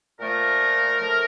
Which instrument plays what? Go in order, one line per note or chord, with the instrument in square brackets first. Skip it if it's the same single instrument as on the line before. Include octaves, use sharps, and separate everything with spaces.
[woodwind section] A#2 F3 A3 A#4
A2 F3 A3